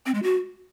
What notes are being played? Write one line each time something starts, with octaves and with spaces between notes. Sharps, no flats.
C4
G#3
F#4